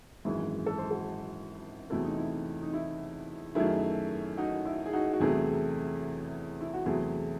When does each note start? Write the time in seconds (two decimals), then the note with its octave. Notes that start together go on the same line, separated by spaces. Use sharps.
0.25 G#1 F#2 E3 G#3 E4 G#4
0.66 A4
0.78 C5
0.91 F#4 A4
1.90 E2 C3 F#3 A3 E4
2.04 D#4
2.18 E4
2.62 D#4
2.73 E4
3.55 F#2 D#3 F#3 A3 E4 G#4
4.37 D#4 F#4
4.65 E4
4.86 G#4
4.93 D#4 F#4
5.13 F#4
5.20 E2 C3 F#3 A3 E4 G#4
6.61 E4
6.74 F#4
6.86 E2 C3 F#3 A3 E4 G#4